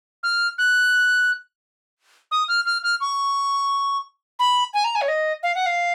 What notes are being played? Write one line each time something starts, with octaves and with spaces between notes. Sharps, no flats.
F6
F#6
D#6
F6
F6
F6
C#6
B5
G#5
A#5
G#5
C#5
D#5
F5
F#5
F5